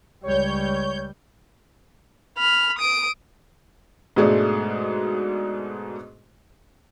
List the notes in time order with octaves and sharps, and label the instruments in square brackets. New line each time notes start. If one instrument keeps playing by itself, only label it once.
[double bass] C#2 G3 [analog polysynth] C#5 G6
[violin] B5 F6
D#6 D7
[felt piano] G#2 B2 G#3 A3 D4